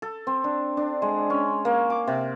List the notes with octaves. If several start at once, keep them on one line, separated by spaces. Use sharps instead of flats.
A4
C4
D4
D4
G#3
C#4
A#3
D6
C3